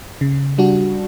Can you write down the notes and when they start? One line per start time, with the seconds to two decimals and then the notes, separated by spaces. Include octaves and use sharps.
0.21 C#3
0.58 G3 D4 F#4